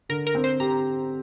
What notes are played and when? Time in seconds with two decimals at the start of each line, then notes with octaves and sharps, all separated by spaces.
0.09 D3 A#4
0.27 A#4
0.35 C4
0.44 C5
0.60 G4 A#5